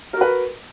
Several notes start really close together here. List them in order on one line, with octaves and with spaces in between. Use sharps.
A#4 F#4 B4